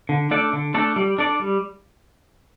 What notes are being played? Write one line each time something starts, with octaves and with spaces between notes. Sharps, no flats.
D3
A3 D4 A4 D5
D3
A3 D4 A4 D5
G3
D4 A4 D5
G3